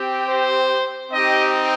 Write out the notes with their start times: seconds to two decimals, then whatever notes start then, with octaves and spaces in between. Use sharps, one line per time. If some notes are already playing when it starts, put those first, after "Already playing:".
Already playing: C4 G4
0.26 C5
1.12 C4 D#4 G4 D#5